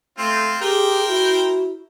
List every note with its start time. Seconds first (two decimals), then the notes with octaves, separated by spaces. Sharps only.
0.18 A3 C4 F4
0.61 G4 G#4 A#4 C5 G5
1.08 E4 F#4